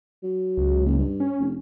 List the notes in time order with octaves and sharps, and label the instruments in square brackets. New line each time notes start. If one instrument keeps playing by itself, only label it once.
[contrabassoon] F#3
[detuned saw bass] C#2
[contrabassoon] F#1
G2
[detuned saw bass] C#4
[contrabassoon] F1